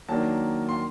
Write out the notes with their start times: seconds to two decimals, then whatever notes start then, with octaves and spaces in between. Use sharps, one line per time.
0.09 D#3 F#3 A#3 D4 A5
0.69 C6